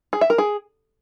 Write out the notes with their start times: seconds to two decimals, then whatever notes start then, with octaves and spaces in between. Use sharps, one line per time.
0.13 G#4
0.21 E5
0.30 A#4
0.38 G#4